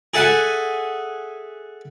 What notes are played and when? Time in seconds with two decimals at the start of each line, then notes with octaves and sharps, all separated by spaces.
0.14 G#4 A4 E5 F#5 G#5